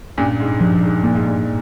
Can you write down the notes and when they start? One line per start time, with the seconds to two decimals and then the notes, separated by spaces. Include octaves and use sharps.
0.18 G2 A#2 C#4
0.40 G#2
0.61 G2 F3
0.83 G#2
1.03 A#2 A#3
1.15 G#2
1.26 G2 A#2